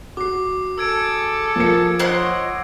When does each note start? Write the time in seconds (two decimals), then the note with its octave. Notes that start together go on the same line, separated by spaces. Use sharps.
0.17 F#4 D6 C7
0.78 G#4 A4 E6 G#6 D7
1.56 F3 A#4 C#7
1.99 C5 C#5 D#5 F#5 F#6